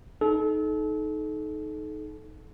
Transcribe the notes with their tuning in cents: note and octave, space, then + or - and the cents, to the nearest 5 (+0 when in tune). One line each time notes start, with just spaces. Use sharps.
D#4 +0 A4 -35